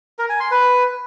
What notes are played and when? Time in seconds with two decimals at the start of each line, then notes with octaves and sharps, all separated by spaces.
0.19 A#4
0.29 G#5
0.40 C6
0.51 B4